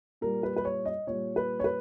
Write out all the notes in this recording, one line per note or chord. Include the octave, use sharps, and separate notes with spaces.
A#2 G3 A#4
B4
B4
C#5
D#5
A#2 G3 C#5
B4
C#5
B4